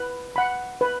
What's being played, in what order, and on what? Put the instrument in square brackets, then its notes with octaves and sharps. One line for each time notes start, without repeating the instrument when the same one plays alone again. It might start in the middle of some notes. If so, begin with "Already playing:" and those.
Already playing: [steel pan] B4
F#5 B5
B4